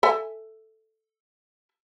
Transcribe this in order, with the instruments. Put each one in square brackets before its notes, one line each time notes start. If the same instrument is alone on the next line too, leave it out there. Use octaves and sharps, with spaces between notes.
[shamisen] A4 E5 G#5